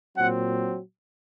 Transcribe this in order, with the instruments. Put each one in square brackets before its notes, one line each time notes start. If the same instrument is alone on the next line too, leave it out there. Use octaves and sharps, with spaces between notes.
[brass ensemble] A#2 F#3 C4 F#5